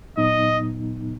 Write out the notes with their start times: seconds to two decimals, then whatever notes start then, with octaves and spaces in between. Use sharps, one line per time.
0.17 A#2 F#3 B3 D#4 D#5